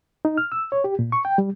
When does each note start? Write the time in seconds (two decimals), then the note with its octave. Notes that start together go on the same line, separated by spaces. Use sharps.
0.25 D#4
0.38 F6
0.52 E6
0.72 C#5
0.84 G4
0.99 A#2
1.12 C#6
1.25 G5
1.38 G3